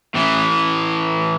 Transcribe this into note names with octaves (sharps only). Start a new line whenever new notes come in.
A2 E3